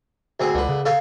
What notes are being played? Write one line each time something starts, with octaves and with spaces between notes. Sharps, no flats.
D2 C4 G#4
C#2 D3 B4
C#3
A4 C#5 F5